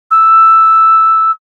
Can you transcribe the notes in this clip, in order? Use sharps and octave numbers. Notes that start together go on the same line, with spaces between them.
E6